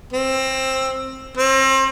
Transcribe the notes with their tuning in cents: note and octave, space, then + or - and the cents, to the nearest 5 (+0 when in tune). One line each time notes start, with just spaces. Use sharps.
C4 +15
C4 +35